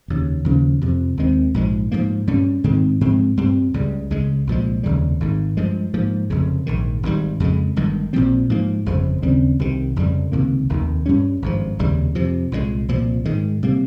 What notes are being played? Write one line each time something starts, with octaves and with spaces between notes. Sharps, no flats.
F1 D#2 C#3
D#2 C#3 F3 A#3
F2 C3 F3
D#2 D#3 G#3 C4
A#1 G#2 F3 G#3
G#2 F3 A#3
G2 G3 C#4
G#2 D#3 G#3 C4
G#2 F3 G#3 C4
G2 G3 C4
C#2 C#3 G3
C#2 C#3 G#3
C2 A#2 F3 G#3
F1 D#2 C#3 G3
G#1 G#2 D#3
G2 F3 G#3
G#2 F3 A#3
F1 F2 C#3
A#1 G#2 D#3
G#1 G#2 D#3 G3
F2 C#3 G#3
G1 G2 D#3 G#3
A#1 A#2 F3 C4
G#2 F3 A#3
G1 F2 C#3 F3
D#2 C#3 G3 C4
C2 C3 D#3
F1 F2 C#3 G3
C#2 C3 D#3 A#3
F1 D#2 D#3
G2 G3 C#4
G#1 G2 F3
F1 D#2 C#3 G3
F2 C3 F3
C2 A#2 F3 G#3
C2 A#2 F3
G#2 D#3 G#3
C3 G3 A#3